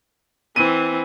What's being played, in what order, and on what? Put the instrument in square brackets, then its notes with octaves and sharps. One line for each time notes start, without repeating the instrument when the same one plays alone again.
[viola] E3 C4 [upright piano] D#7